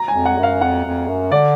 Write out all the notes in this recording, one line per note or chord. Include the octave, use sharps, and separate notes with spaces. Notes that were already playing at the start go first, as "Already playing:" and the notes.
Already playing: A#5
G#5
F2
F#5
F#2
F5
F2 F#5
F2
F#2
D3 D5